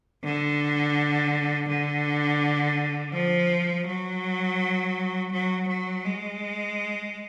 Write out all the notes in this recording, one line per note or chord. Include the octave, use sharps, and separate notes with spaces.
D3
D3
F3
F#3
F#3
F#3
G#3